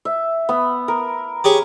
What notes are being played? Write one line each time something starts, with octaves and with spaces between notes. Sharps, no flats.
E5
B3
A#4
G4 G#4 C#5